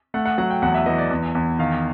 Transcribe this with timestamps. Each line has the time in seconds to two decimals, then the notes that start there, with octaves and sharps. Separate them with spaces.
0.14 A3 F#5
0.26 F#5
0.38 F#3 F#5
0.50 G5
0.62 E2 F#5
0.75 E5
0.86 E3 D#5
0.98 D5
1.11 E2
1.35 E2
1.59 D#3 F5